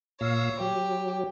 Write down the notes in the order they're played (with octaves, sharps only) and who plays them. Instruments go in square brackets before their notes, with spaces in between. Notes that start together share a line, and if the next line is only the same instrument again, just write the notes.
[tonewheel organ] A#2 F5 E6 [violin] C#5 A#5
[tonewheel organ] F#3 [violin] G4